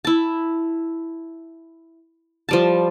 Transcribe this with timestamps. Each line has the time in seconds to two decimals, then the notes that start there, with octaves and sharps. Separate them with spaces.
0.05 E4 A5
2.49 F3 G3 A5